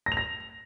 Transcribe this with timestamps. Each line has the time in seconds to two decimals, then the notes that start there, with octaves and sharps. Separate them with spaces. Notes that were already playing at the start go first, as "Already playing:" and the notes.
0.06 A#6
0.12 F7
0.17 A#6